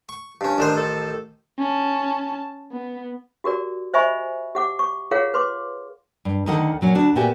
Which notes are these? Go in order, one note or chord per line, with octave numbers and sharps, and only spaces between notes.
C#6
G2 C#4
A1 D#3 D4 C5
A4
C#4 A5
B3
F#4 G4 A#4 D5
C5 D#5 E5 G#5 B5 C#6
G4 F#5 D6
C#6
F4 G#4 A#4 C#5 F5 F#5
B4 C6 D6
G2
D2 D3 D#3 D#4 A4 F#5
A#2 F#3 C#4
D2 D4 F#4
A#2 B3 F#4 G4 E5 G#5